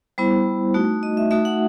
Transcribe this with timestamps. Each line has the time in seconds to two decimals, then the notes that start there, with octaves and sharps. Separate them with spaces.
0.18 G3 B3 E4 C5
0.74 A3 D#4 F#4
1.03 D#5
1.17 E5
1.31 A3 D#4 F#4 E5
1.45 F#5